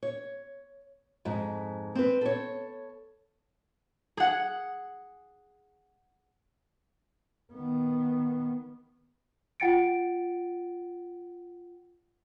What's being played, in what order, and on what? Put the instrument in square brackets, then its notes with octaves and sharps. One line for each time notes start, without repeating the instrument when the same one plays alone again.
[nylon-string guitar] C#5
F2 G#2
C4 B4
A4 C#5
[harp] G#4 F#5
[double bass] D#3 B3
[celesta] F4 F#5 G5 A6 C#7 D7